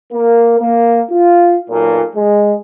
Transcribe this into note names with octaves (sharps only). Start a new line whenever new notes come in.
A#3 A#4
A#3
F4
B1 A#2
G#3